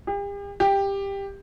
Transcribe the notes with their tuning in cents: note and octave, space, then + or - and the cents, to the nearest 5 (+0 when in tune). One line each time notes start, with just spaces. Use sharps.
G4 +40
G4 +10